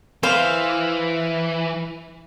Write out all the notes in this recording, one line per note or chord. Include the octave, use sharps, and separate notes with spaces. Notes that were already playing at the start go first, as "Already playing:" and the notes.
E3 C5 F5